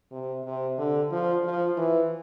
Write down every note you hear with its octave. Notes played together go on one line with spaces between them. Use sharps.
C3
C3
D3
F3
F3
E3